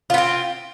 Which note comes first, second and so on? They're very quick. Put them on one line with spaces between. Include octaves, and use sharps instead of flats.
F4 B3 C4